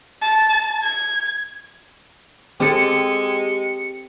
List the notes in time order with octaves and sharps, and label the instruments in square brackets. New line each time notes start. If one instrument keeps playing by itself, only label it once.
[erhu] A5
G#6
[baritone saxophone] G#3 [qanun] C4 A4 [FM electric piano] G4 C#7